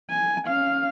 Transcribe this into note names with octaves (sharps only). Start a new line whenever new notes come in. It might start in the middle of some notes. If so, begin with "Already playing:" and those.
G#5
C#4 F5